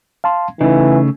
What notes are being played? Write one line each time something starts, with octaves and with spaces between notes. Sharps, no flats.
F5 A5 C6
C#3 E3 A3 D#4